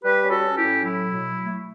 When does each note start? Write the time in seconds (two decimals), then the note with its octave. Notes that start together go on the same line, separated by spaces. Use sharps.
0.03 G3 G4 B4
0.24 C#4
0.30 F#4 A4
0.44 C#4
0.57 E4 G4
0.64 A2
0.83 F#3 E4
1.03 B2
1.23 F#3
1.43 A3